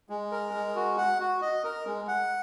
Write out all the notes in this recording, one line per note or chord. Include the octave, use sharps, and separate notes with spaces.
G#3
A#4
G#3
F#4
F#5
F#4
D#5
A#4
G#3
F#5